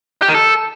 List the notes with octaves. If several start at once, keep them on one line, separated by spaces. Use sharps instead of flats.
G4
D#3
A4